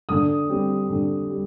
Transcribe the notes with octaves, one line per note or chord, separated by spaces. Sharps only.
D3 D#6
G3 C4
D3
G3